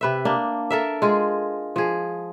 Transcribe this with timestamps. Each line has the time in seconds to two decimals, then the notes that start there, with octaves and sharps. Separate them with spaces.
0.01 C3 B4 E5
0.25 A#3 D4
0.70 A4 A#4 E5
1.02 G#3 F4 G#4
1.76 F3 G#4